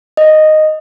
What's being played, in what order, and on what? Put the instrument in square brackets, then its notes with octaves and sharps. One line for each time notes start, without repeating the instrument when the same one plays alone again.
[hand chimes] D#5